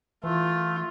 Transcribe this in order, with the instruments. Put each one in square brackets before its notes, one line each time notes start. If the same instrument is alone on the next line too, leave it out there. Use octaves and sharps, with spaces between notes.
[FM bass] E3 [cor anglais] A3 [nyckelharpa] F4